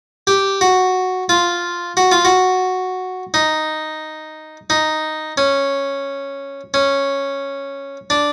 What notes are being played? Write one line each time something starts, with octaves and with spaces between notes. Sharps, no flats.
G4
F#4
F4
F#4
F4
F#4
D#4
D#4
C#4
C#4
D4